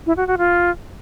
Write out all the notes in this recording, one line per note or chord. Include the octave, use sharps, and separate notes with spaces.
E4
F#4
F#4
F4